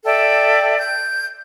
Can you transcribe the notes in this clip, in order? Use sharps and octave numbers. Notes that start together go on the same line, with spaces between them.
A4 D5 E5 G5
G6